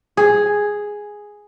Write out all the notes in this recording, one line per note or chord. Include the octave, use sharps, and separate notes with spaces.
G#4